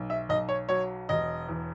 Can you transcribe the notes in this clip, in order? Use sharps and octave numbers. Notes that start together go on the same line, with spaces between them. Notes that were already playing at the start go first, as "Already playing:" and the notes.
Already playing: B1
E5
B1 D#5
C#5
F#3 C#5
E1 D#5
E2